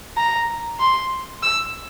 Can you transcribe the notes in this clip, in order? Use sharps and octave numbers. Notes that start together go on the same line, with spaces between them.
A#5
C6
E6